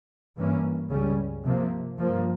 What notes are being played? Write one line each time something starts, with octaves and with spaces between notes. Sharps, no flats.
G2 E3 A#3 C#4
C#2 C#3 G3 C#4
C3 F3 A#3
G2 F3 A#3